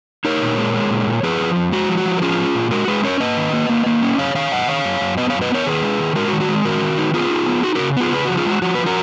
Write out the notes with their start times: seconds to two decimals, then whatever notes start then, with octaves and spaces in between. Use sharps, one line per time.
0.25 D#4 A#4 C#5
0.42 A#2
0.58 G#3
0.74 G#3
0.90 A#2
1.07 A#2
1.23 F3 G#4 B4
1.40 F3
1.56 F2
1.72 G#3 F#4
1.89 F3
1.97 F#4
2.05 F3
2.18 A#4
2.22 C#4 F4 G#4
2.38 C#4
2.55 A#2
2.71 G#3 F#4 A#4
2.88 G#3 G#4 B4
3.03 C#4 A#4 C#5
3.20 A#3 B4 D#5
3.37 D#3
3.53 A#3
3.69 A#3
3.86 A#3
4.02 C#4
4.18 F#2 C#5 F5
4.35 D#3 C#5 F5
4.52 F#2 D#5 F#5
4.68 D#3 C#5 F5
4.85 F#2
5.01 F#2
5.17 B3 B4 D#5
5.30 F#2 C#5 F5
5.41 B4 D#5
5.50 B3 A#4 C#5
5.66 D#3 G#4 B4
5.82 G#3
5.99 D#3
6.15 G#3 F#4 A#4
6.28 F#4
6.33 D#3
6.41 F#4
6.49 G#3
6.65 D#3 F#4 A#4
6.82 D#3
6.98 D#4
7.14 B3 F4 G#4
7.31 D#4
7.47 B3
7.63 D#4 F#4
7.75 C#3 F#4 A#4
7.97 B3 F4 G#4
8.12 C#3 G#4 B4
8.25 F3 F#4
8.37 F4 G#4
8.45 G#3 F#4
8.62 F3 F#4
8.75 F3 B4
8.86 F#4 A#4